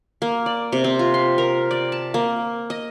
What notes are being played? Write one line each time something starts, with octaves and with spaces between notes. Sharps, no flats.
A#3
D5
C3
C4
F4
C6
A#4
D5
A5
A#3
D#5